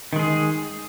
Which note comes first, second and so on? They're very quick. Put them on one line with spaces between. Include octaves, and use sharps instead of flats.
D#3 G#3 G#4